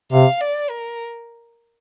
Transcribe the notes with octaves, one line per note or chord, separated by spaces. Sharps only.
C3 F5
D5
A#4